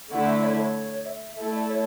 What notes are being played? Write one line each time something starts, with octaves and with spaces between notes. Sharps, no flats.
D3 A3 E4 F#5
E5
C#5
C#5
E5
A3 E4 A4 E5
D5
C#5